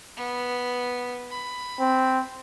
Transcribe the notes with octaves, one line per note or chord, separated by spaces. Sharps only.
B3
B5
C4